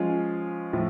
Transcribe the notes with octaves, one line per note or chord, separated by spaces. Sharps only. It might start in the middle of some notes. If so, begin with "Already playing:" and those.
Already playing: F3 G#3 C#4 F4
A2 F3